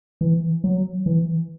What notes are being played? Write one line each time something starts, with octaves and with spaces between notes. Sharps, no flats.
E3
F#3
E3